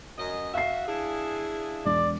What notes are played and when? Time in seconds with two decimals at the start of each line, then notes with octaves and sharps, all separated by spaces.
0.18 F#2 D#5
0.54 F#4 E5 F5 C7
0.87 D4 E4 G#4
1.85 E1 D5